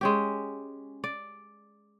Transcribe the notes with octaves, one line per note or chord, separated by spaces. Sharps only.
G#3 C#4 G4
D5